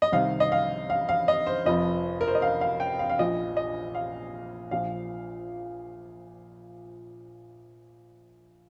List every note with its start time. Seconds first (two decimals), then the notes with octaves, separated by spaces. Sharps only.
0.02 D#5
0.12 C2 C3 D#3 F5
0.40 D#5
0.52 F5
0.90 F5
1.09 F5
1.28 D#5
1.47 C5
1.66 F1 F2 F3 D#5
2.21 A#4
2.28 C5
2.35 D#5
2.42 F5
2.61 F5
2.80 G5
2.99 F5
3.10 F5
3.19 A#1 A#2 F3 D#5
3.57 D#5
3.95 F5
4.71 A#1 A#2 F3 F5